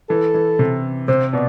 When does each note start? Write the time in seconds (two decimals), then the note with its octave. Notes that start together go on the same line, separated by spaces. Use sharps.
0.10 E3 A4
0.34 E3
0.59 C3
1.08 C3 C5
1.33 B2 D5